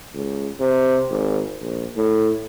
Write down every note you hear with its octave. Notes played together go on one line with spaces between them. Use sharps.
C#2
C3
G#1
A#1
A2